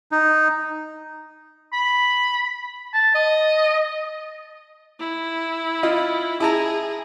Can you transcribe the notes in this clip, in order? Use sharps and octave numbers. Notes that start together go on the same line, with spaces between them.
D#4
B5
A5
D#5
E4
F4 D#5
E4 G#4 A5 A#5